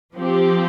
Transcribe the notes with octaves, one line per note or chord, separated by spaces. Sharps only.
F3 C4 G4